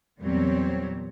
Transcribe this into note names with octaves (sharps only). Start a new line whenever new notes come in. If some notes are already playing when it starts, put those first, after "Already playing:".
E2 A#2 F#3 G3 C4 C#5